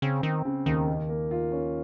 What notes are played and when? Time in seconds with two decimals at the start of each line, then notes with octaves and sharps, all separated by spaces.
0.02 C#3 C4
0.23 D#3 C4
0.45 C#3
0.66 D#2 D#3
0.89 A#3
1.09 A#3
1.31 F4
1.52 C#4